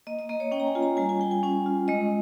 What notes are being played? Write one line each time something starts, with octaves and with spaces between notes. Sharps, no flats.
A#3 D#5
D#5
A#3 D#5
C#5
C#4 G5
A#5
G#5
F4
A#5
G3 G#5
G#5
G3 G5
G#5
C#4 G#5
F4
G#3 D#5